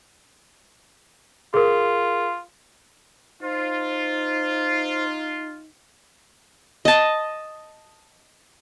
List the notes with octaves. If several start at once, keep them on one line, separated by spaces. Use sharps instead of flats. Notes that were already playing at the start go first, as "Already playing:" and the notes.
F4 G#4 A#4
D#4 F4 C5
D#5 A5